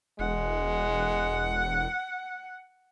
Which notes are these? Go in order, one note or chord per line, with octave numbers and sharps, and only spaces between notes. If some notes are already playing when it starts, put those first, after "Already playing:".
E1 G#3 F#5